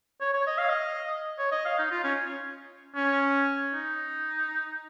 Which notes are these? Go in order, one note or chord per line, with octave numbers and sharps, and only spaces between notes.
C#5
C#5
D#5
F5
D#5
C#5
D#5
F5
D#4
F4
C#4
C#4
D#4